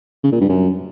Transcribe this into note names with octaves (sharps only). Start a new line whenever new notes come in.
C#3
A#2
G2
F#2